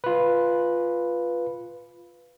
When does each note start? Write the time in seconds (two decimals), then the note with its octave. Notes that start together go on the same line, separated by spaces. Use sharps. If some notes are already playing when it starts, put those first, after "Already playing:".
0.04 F4 B4